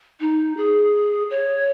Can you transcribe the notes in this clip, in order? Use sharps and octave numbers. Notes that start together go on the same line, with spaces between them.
D#4
G#4
C#5